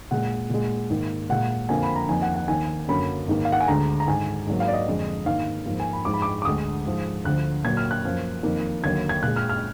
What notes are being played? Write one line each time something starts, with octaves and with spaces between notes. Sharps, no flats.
A#2 G#3 F#5
A#2 G#3
G#2 D#3 A#3
A#2 G#3 F#5
F2 D3 F3 A#3 G#5
B5
A#5
F2 D#3 A#3 G#5
F#5
F#5
D#2 D#3 A#3 G#5
F#2 D3 F#3 A#3 B5
G#2 D#3 A#3
F5
F#5
G#5
D2 D3 G#3 A#5
A#5
G#2 D#3 G#3 G#5
G#2 F#3 A#3
F5
D5
D#5
F2 D3 G#3
G#2 D#3 A#3 F5
G#2 F3 A#3
G#5
B5
G#2 F3 G#3 D6
B5
D6
D6
D2 D3 G#3 D#6
G#2 F3 G#3
D2 D3 F3 F#6
A#2 F#3 A#3 G#6
F6
F#6
F#2 F3 A#3
F2 D#3 A#3
D#2 D3 F#3 A#3 G#6
G#6
A#2 G#3 F#6
F6
F6